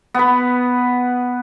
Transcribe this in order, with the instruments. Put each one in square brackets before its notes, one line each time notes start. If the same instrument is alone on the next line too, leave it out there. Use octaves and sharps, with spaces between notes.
[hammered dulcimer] B3 B4